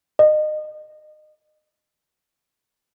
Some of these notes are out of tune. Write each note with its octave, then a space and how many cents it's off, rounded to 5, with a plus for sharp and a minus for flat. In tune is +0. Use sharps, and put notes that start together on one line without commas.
D#5 -30